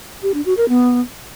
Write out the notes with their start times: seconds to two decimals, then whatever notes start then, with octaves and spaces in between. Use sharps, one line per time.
0.23 G4
0.34 D4
0.46 F#4
0.57 A#4
0.69 B3